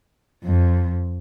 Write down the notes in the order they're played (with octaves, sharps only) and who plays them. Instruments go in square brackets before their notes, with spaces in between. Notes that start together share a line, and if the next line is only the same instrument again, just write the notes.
[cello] F2